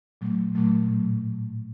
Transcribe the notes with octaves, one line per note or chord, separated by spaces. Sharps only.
A#2 F#3 A3
A#2 F#3 A3
A2 F#3